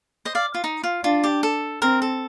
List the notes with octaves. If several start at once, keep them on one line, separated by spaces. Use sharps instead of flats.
C5 D#5
D5 F5
F4
D#4
F4
D4 F4
G4
A4
C4 A#4
A4